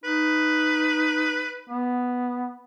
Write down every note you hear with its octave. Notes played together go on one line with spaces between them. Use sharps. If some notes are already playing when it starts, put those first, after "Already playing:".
D#4 B4
B3